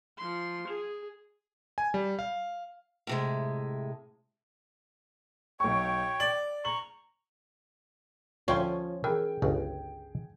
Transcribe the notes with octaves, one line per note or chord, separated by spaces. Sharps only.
F3 C6
G#4
G#5
G3
F5
A2 C3 G#3
B1 C#5 G5 C#6
D5 F#7
A#5 C#6 F#7
D2 F3 C#4 F4 F5 G5 C6
E3 G#4 A#4 G5
G1 C#2 C#3